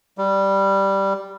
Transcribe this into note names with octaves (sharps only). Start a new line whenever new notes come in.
G3